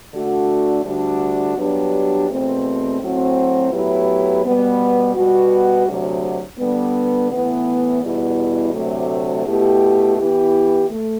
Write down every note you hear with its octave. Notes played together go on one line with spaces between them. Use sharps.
D3 A3 D4 F#4
D2 D3 G3 D4 F#4
G2 F#3 B3 D4 G4
E2 B2 A3 C4
A2 F#3 C4 F#4
A2 F#3 B3 E4 G4
B2 G3 B3
B2 G3 B3 F#4
D2 C3 F#3
D3 G3 B3
A2 E3 B3
E2 B2 G3 B3 E4
D2 C3 F#3 A3
B2 A3 E4 G4
E3 B3 E4 G4
A3